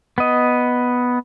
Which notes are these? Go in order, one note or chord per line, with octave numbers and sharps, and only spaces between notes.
B3 D#5